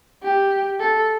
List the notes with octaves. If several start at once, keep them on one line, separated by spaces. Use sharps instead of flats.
G4
A4